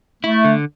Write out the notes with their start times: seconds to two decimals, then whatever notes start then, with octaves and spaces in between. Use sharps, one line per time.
0.23 A3 E4
0.44 D3